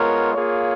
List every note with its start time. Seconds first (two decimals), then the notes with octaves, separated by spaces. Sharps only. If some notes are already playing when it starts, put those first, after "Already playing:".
Already playing: G#3 B3 F4 A#4 C#5
0.35 A#3 F4 G#4 C#5